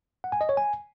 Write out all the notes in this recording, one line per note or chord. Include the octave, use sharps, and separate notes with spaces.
F#5
G#5
D#5
C#5
G#5